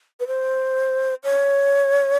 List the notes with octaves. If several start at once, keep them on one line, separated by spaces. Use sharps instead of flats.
B4
C5
C#5